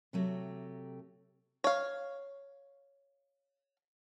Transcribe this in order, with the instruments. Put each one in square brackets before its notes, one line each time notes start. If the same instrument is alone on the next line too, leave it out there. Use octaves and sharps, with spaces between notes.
[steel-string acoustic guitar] C3 F#3 A3 G4
[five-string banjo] C#5 F5